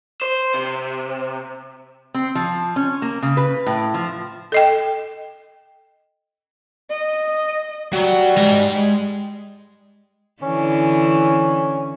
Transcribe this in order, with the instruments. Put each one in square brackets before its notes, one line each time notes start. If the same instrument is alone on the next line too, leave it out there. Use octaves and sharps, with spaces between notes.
[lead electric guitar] C5
C3
[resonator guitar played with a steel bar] C4
F3
C#4
A#3
C#3
B4
A2
F3
[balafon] A4 D#5 G5
[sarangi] D#5
[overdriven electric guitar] F#3 [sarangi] G3
[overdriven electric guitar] G#3 A#5
[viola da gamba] D3 E3 [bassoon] C#4